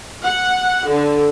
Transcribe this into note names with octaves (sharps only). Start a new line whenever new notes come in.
F#5
D3